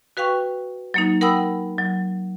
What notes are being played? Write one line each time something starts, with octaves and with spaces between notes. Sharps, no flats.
F#4 B4 F5 G5 C#6
F#3 A#3 D#4
A#4 F#5 G5 B5 D#6 E6
F#3